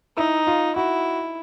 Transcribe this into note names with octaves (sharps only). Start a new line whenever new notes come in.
D#4 E4
F4
E4 F#4